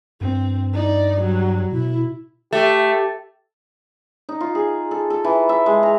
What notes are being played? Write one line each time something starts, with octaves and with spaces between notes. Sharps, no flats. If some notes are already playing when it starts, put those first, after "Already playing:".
G2 C4
D#4 D5
F#3 G3
B2 E4
A3 G4
D#4
F4
G#4
A4
A4
E3
E5
G#3
A#5